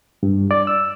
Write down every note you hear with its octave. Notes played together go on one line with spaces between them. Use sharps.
G2
D5
E6